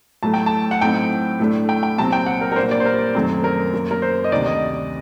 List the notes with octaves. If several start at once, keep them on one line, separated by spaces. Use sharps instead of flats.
A2 F#3 A3 A5
G5
A5
F#5
A2 F#3 A3 C4 D#4 G5
A2 A3 D4
G5
G5
C2 A#2 F#3 C4 A5
G5
F#5
A#4
A#4
A#2 G3 A#3 D4 C5
D5
C5
A#4
F#2 D#3 F#3 A3 C4
A#4
F#2 F#3 A#3
A#4
C5
D#5
D2 C3 D#3 D5
D#5